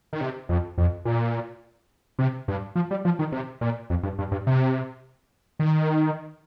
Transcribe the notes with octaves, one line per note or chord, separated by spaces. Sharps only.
D#3
C3
F2
F2
A#2
C3
G2
F3
G3
F3
D#3
C3
A#2
F2
G2
G2
G2
C3
D#3